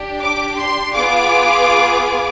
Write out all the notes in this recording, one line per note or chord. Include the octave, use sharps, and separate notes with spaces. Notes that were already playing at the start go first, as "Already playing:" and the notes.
Already playing: D4 G4
D6
C6
B3 F4 G#4 D6